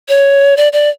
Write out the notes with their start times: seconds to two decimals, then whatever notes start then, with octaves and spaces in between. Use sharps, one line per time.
0.09 C#5
0.57 D5
0.73 D5